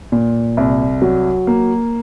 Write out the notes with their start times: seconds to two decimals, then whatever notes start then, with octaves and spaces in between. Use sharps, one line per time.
0.12 A#2
0.57 C2
1.02 F#3
1.47 A#3